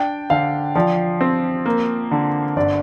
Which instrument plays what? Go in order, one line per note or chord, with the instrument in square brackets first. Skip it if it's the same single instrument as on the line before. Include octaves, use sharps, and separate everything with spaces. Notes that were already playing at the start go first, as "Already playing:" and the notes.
Already playing: [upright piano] D4 [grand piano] G5
[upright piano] D3 [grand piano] F5
[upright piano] F3 [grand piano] D5
[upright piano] C4
A#3
D3
[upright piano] G1 [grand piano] D5